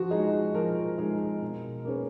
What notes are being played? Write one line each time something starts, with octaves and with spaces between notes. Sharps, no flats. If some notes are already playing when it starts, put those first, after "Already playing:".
Already playing: F3 F#4
G#3 D#4 G#4
F3 A#4
G#3 D#4 G#4
B2
A#3 C#4 G#4 B4